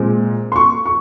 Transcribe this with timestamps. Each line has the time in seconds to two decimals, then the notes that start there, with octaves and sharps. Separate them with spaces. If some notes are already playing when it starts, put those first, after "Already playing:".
Already playing: A#2 G#3 C4
0.52 C6
0.56 C#6
0.86 C#6